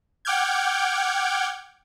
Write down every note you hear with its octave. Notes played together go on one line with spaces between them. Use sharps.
F#5 G5 D6 F6 G6 G#6